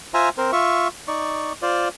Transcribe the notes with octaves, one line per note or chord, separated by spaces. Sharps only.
F4 C5 E5 G#5 A#5
C4 A#4 C5
F4 E5 C#6
D#4 D5 C#6
F4 C5 D5